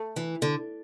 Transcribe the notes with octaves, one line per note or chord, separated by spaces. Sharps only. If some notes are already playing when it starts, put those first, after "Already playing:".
Already playing: A3
E3
D3